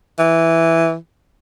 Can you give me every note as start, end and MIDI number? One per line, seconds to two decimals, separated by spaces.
0.19 0.95 52